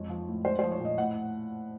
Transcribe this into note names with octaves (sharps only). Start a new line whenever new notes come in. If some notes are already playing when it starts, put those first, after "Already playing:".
Already playing: F2 G#3 C#5
F3
A2
G#3 C5
F3 C5
C#5
A#2
D#5
A2 F#5